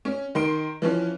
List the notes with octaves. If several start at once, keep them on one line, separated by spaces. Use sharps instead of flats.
C#4
D#3 C6 D7
E3 F3 C#4